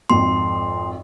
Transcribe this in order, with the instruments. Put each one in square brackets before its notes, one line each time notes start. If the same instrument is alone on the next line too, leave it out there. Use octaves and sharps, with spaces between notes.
[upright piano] G#1 F2 [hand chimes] C6